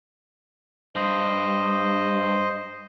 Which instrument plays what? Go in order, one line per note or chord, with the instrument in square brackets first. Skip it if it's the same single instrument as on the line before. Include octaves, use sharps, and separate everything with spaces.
[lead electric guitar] G2 [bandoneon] C5 D#5